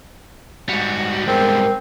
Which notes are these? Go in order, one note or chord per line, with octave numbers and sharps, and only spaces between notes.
G#2 G3 F#4
G#3 B3 C4 A#4